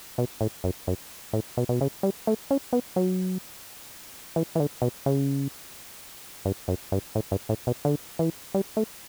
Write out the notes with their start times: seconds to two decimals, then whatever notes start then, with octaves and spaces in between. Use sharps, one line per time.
0.18 B2
0.41 A2
0.64 F#2
0.87 F#2
1.33 A2
1.57 B2
1.69 B2
1.81 C#3
2.03 G3
2.27 A3
2.51 C#4
2.73 B3
2.96 F#3
4.36 E3
4.55 E3
4.60 D3
4.82 B2
5.06 C#3
6.45 G2
6.68 F#2
6.92 G2
7.15 A2
7.31 G2
7.49 A2
7.67 B2
7.85 D3
8.19 E3
8.54 G3
8.77 A3